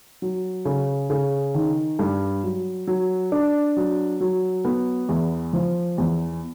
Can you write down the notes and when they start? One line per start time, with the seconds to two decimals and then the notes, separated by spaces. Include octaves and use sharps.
0.22 F#3
0.65 C#3
1.10 C#3
1.55 D#3
1.99 G2
2.44 F#3
2.87 F#3
3.32 D4
3.76 F#3
4.21 F#3
4.65 B3
5.09 E2
5.53 F3
5.98 E2